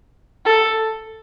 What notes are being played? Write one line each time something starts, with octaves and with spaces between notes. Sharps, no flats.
A4